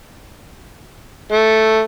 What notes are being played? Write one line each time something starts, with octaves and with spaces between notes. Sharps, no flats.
A3